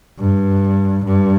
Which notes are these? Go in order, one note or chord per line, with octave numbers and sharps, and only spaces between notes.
G2
G2